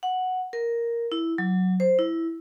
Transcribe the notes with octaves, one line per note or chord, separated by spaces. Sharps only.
F#5
A#4
E4
F#3
C5
E4